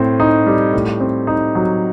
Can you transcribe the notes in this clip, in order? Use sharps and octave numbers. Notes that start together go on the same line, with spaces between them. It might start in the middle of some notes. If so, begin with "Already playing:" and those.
Already playing: A2 C4
D#4
G3
A2
C4
D#4
F#3